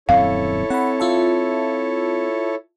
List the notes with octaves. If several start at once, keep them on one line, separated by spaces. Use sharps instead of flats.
D#1 F#2 C4 E4 A4 C#5 F5
C4 F#5 B5
F4 E5 A5